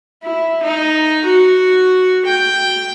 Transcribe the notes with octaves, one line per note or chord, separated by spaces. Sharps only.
E4
D#4
F#4
G5